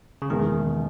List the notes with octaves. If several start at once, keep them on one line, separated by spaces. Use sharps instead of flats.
C#3
F#1 E2 B2 D#3 G#3